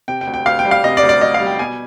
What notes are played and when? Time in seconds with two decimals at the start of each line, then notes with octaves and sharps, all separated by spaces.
0.08 C3 G5
0.21 G5
0.27 D2
0.34 G5
0.46 D2 F5
0.59 G5
0.65 G3
0.71 F5
0.84 C3 D#5
0.97 D5
1.03 D2
1.09 D5
1.21 D2 D#5
1.34 F5
1.40 G3
1.47 G5
1.59 B2 G#5